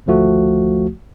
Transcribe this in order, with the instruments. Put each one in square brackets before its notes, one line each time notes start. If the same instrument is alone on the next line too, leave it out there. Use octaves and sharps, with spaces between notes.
[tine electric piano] G#1 D2 F3 A3 F#4